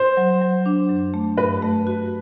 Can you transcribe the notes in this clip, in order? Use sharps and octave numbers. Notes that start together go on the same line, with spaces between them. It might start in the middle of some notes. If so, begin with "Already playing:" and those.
Already playing: C5
F#3
F#3
D4
F#2
A3
G2 B4
A3
F#4